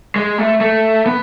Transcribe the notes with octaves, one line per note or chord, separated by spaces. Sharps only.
G#3
A3
A3
B3